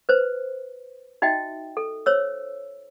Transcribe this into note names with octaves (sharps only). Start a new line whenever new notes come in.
B4 C5
D#4 F#4 D#5 E5 G5
A4
C5 C#5 E6